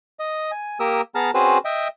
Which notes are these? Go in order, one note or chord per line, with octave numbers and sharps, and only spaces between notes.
D#5
G#5
A#3 G4 A#4 D#6 E6
B3 G#4 A5 A#5 F6
C4 C#4 F#4 G#4 B4 C5
D#5 E5 G5